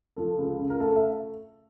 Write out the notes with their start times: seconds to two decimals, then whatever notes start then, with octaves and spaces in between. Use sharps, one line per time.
0.16 F3 A4
0.38 C#2
0.59 C#3
0.70 A#4
0.80 A3 A4
0.96 E5